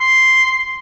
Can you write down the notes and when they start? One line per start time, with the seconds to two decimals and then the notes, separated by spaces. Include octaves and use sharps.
0.01 C6